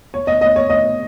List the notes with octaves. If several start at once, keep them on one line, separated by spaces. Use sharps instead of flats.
C#5
D#5
D#5
C#5
D#5